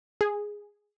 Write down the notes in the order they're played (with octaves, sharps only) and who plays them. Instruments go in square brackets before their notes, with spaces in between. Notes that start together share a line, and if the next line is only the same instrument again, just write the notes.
[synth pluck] G#4